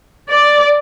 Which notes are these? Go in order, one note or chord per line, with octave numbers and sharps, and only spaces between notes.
D5